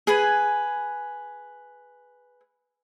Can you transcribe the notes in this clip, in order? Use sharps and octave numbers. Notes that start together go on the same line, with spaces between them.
G#4 B4 G#5